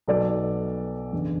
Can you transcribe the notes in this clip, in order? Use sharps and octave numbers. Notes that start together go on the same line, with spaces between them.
B1 B2 F#3 A4 D5
F#1 E2 D3